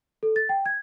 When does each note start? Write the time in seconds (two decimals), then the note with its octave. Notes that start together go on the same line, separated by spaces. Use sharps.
0.23 A4
0.36 A6
0.49 G5
0.66 G#6